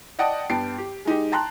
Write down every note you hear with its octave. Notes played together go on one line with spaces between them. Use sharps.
D5 D#5 F#5 G5 A5 D#6
G2 B3 G5 A5 C7 D7
G4
G#3 D#4 G4
G5 A5 A#5 C6 F#6